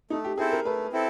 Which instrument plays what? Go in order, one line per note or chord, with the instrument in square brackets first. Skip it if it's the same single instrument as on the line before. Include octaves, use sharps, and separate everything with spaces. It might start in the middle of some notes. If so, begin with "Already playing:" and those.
[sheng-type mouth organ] A3 [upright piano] D#4
[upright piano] G4
[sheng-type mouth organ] C4 E4 A4 C5 [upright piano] G#4
[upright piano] A#4
[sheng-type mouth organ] A3 [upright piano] B4
[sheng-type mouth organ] C4 E4 A4